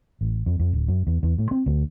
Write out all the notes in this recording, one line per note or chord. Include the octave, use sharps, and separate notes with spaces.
A1
F2
F2
D1
F#2
E2
E2
A2
C4
D2